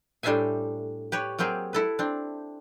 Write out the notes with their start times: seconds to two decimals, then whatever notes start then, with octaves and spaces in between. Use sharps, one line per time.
0.23 A2 G3 D4 C5 E5 G#5
1.12 G4 B4 C#5
1.39 F#3 A#3 C4 G4 G#4
1.73 E4 A4 B4
1.99 C4 D4